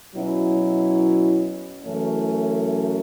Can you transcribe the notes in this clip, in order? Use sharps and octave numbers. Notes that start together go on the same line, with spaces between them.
B2 F#3 C#4 E4
F#2 C#3 E3 A3 C#4